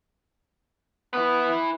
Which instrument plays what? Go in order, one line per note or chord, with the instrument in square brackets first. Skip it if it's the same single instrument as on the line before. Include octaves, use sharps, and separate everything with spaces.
[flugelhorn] B3 [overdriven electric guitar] E4 B4